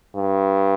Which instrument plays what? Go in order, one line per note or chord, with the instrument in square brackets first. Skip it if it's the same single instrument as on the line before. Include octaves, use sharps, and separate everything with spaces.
[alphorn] G2